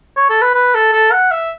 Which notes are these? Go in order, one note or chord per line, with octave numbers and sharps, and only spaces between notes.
C#5
A4
B4
B4
A4
A4
F#5
E5